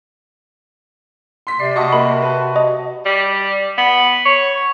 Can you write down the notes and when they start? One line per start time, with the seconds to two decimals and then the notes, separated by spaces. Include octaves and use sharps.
1.47 C6 B6
1.60 C3 D5 C7
1.76 F#4 D#5 A5 C#6
1.93 A#3 B5
2.22 B4 A5
2.56 D#5
3.05 G3
3.78 B3
4.26 C#5